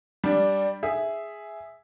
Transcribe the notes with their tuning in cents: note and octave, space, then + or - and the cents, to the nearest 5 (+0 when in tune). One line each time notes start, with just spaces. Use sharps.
G3 +0 D4 -5
G#4 +0 E5 +0